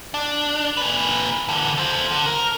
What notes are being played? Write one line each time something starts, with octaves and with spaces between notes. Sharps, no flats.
D4
A#2 B4
D3 E3
A4 C5
D3
A#4